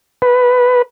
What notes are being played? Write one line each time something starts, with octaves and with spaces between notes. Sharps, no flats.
B4